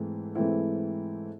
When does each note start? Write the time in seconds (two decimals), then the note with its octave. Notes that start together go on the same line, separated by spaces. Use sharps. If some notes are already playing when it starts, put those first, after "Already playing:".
Already playing: G#2 E3 A3 C4 E4
0.35 G#2 E3 A3 C4 E4